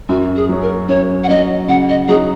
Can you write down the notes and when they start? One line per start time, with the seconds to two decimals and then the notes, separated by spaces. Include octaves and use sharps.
0.09 F#2 F#4
0.36 G#4
0.49 F#3 C#4
0.62 A#4
0.89 F#2 C#5
1.24 F#5
1.28 F#3 C#4 D#5
1.68 C#3 F#5
1.89 D#5
2.08 F#3 D#4 G#4